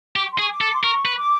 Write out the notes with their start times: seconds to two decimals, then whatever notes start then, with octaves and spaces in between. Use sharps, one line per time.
0.16 G4 D6
0.25 C#6
0.32 C6
0.39 G#4 C#6
0.50 D6
0.61 A4
0.73 C6
0.84 A#4 C#6
1.05 B4
1.17 D6